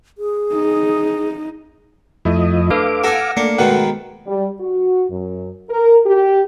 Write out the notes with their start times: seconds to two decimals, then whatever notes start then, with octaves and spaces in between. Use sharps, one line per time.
0.18 G#4
0.53 D#4
2.25 F2 F3 A3 E4 D#5
2.70 D4 A4 B4 F5 D6
3.04 A4 F#5 G#5 A#6
3.37 A3 A#3 D4 C#7
3.58 G#2 B2 D#3 F#5
4.27 G3
4.61 F#4
5.10 F#2
5.70 A#4
6.06 G4